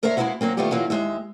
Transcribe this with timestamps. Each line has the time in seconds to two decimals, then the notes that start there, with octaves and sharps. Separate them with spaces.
0.03 D2 A#4 C5 C#5 E5 F5
0.17 G#3 A#3 B3 D#4 E4 F#4
0.41 C#3 F#3 A#3 C4
0.57 D#3 G3 A3 B3 F4 G4
0.71 E3 F#3 A#3 F4
0.90 D#2 C3 G#3 G4 E5